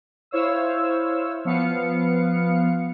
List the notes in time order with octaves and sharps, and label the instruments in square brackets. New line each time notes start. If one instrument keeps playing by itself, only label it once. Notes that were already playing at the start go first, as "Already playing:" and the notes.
[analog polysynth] E4 C5 C#5 F5 E6
F3 B3 F5 C#7